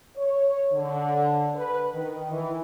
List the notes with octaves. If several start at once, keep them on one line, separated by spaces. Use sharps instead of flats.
C#5
D3
B4
D#3
E3